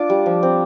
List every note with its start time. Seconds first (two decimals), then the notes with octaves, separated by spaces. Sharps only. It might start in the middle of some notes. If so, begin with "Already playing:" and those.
Already playing: D4 F4 D6
0.10 G3
0.26 F3
0.43 C4